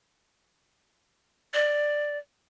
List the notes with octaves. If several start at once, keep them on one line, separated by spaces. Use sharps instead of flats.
D5